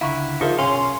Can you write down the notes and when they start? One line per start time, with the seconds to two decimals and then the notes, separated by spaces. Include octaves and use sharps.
0.01 C#2 D3 E4 F5 A#5 C#6
0.41 F3 D#4 G#4 A#4 E5
0.59 B1 C3 C#4 F5 C6